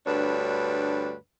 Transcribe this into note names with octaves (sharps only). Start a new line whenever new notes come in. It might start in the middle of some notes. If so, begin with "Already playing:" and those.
D2 G2 D4 B4 C#5